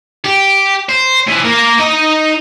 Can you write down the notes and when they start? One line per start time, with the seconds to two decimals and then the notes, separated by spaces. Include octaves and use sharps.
0.24 G4
0.89 C5
1.27 E3 F3
1.45 A#3 A#4
1.79 D#4 D#5